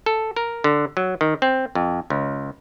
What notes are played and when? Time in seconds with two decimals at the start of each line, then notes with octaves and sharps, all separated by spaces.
0.06 A4
0.36 A#4
0.64 D3
0.97 F#3
1.21 D#3
1.42 C4
1.75 F2
2.10 C#2